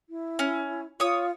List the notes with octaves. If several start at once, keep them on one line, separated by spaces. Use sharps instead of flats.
E4
C#4
F4 C#5 D#6